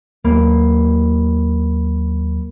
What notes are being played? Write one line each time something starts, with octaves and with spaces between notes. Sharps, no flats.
D#2 F#3 A#3 B5